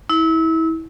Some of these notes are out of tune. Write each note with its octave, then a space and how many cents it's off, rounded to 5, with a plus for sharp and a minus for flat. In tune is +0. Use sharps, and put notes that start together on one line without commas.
E4 -30